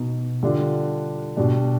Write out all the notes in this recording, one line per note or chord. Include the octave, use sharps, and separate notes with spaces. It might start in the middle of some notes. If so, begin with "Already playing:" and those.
Already playing: B2 B3 D#4
D3 G3 D4 F4
B2 G3 D4